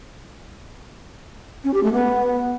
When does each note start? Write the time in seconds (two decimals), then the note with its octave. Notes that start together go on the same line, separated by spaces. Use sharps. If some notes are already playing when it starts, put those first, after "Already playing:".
1.64 C#4
1.74 G4
1.83 A3
1.93 B3